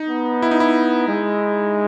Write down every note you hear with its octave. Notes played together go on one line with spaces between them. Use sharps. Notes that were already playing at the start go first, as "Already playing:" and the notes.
Already playing: D#4
B3
E4
D#4
E4
G#3